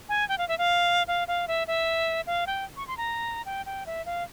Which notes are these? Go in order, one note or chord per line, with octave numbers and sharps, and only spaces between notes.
G#5
G5
F5
E5
F5
F5
F5
E5
E5
F5
G5
C#6
C6
A#5
G5
G5
E5
F5